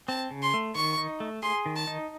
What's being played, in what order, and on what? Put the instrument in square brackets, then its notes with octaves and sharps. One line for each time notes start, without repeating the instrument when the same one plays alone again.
[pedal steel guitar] C4 [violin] A5
[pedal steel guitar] C#3
[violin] C6
[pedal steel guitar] A3
[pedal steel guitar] D#3 [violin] C#6
[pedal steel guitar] D#4
A3
[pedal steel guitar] G#4 [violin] C6
[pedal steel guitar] D#3
[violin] A5
[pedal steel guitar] D#4